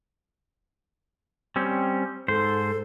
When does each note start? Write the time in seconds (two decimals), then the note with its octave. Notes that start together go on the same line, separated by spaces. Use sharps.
1.56 G3 C4 C#4
2.28 G#2 A4 C5